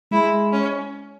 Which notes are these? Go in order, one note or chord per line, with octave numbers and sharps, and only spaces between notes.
G#3 E4
C#4